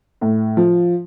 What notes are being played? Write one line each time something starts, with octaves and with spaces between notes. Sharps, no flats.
A2
F3